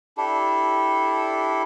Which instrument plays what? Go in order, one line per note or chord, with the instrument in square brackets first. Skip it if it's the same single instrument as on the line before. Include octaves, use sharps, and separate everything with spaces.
[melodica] D4 E4 G4 A4